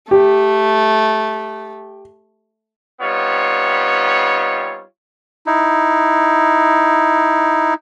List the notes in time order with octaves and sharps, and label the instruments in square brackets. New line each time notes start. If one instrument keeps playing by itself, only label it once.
[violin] A3 [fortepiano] G4
[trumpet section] G3 B3 C4 D#4 F4 C#5
[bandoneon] D#4 E4